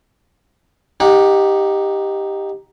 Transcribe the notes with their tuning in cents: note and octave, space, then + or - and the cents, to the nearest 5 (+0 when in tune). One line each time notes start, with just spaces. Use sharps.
D#4 +0 G4 +5 F#5 -25